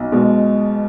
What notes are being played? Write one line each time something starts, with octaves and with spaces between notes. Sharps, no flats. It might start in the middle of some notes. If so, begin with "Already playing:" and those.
Already playing: B1
B2 G#3